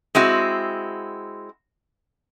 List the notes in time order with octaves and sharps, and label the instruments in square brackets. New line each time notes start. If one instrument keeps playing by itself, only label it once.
[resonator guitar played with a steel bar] G#3 C4 E4 F#4